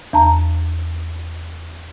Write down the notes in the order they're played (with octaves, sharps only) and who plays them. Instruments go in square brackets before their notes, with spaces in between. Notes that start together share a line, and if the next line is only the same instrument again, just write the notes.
[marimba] E2 A5 A#5